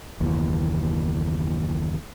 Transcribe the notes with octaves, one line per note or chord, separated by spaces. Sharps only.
F#1 D#2 B2 E3